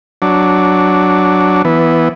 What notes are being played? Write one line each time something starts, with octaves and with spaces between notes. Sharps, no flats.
F#3 D4
E3 B3